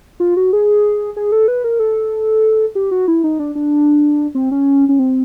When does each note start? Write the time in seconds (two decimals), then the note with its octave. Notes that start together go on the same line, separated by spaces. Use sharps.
0.20 F4
0.37 F#4
0.53 G#4
1.17 G#4
1.32 A4
1.48 B4
1.64 A#4
1.79 A4
2.75 G4
2.91 F#4
3.08 E4
3.24 D#4
3.39 D4
3.55 D4
4.35 C4
4.51 C#4
4.89 C#4
4.99 C4